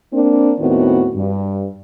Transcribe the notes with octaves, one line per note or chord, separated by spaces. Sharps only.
A#3 C4 D4
D#2 A2 D#3 B3 C4 F#4
G2